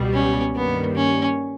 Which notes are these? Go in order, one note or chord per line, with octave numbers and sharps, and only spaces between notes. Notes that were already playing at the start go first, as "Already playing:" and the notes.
Already playing: C#2 B2 G3 B3
C#4
G2 D#3 G3 A#3 B3
C#4